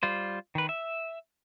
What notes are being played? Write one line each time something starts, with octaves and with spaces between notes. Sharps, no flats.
G3 F4 C5
D#3 B4
E5